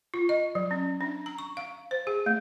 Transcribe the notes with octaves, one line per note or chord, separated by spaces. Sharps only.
F4
D#5
F#3
C#4
D4
A#5
C#6
F5
C5
G#4
A3